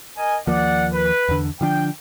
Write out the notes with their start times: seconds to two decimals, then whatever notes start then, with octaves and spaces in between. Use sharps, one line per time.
0.17 A#4 D#5 G#5
0.47 D#2 F3 A#3 D5 F#5
0.93 B4
1.29 E2 D3
1.61 D3 F3 D4 G5